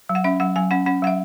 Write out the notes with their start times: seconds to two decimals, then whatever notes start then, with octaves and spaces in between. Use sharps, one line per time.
0.09 F#3
0.15 F#5
0.24 C#4 E5
0.40 F#3 F#5
0.56 F#3 G#5
0.71 C#4 F#5
0.86 C#4 F#5
1.02 F#3 F#5
1.07 E5